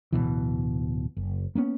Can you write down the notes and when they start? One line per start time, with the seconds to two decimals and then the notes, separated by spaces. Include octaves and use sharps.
0.13 D1 B1 B2 E3
1.17 F#1
1.55 A#3 B3 C#4